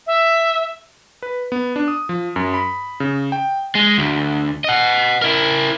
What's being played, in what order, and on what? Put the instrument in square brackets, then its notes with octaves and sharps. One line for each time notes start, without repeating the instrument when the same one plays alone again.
[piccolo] E5
[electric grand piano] B4
B3
D4
D#6
F3
F#2
B5
C#3
G5
[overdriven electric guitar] G#3
D2
D#5 F#5
E4 A#4